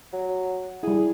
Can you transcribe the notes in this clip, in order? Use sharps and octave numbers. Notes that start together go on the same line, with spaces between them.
F#3
G3 E4 G#4